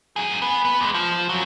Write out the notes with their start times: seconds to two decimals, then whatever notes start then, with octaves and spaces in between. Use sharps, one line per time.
0.16 F#2 G#4
0.42 B3
0.65 B3
0.81 E2 G#3
0.94 F3
1.29 F#2 F#3